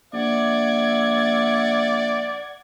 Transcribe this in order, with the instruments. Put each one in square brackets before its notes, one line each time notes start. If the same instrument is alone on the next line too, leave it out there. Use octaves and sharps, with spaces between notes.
[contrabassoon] A#1 [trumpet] D5 [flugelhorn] E5 [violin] F#5 G#6